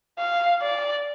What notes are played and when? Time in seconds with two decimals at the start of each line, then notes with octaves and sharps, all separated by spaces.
0.19 F5
0.62 D5